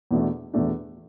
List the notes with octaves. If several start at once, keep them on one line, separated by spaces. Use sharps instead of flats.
E2 B2 A3 D4
E2 B2 A3 D4